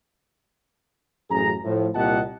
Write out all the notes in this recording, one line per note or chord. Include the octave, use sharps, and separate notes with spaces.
A1 F#2 G#4 A#5
A2 F3
C2 A#2 G4 D#5 F#5 A5